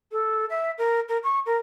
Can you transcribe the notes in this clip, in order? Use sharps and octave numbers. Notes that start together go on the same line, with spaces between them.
A4
E5
A#4
A#4
C#6
A#4